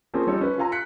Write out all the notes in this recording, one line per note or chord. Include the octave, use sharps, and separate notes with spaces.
F3 A#3 C4 C#4 G#4
G3 D#4 F4 A4 C#5
C#4 B4
F4 A4 F5 G#5 A#5
F#6 B6 C#7